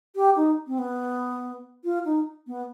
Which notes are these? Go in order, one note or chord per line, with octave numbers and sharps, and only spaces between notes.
G4
D#4
C4
B3
F4
D#4
B3